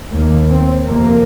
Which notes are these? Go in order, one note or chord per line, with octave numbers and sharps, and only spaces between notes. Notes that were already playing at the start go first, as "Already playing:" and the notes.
D#2 A#3
C4
F2 C3 A#3